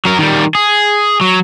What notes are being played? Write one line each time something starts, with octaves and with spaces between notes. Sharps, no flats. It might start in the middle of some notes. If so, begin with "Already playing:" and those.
F#3 A#4
D#3 G3
G#4
F#3